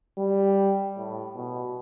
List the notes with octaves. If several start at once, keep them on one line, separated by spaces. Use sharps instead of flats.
G3
A2
B2